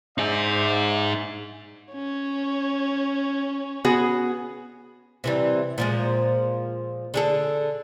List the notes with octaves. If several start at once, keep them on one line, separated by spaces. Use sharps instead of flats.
D#4 G#4 C5 D5 E5
C#4 C#5
B3 F#4 G#4
C3 E3 G3
A#2 F3 G#3
D3 G#4 A4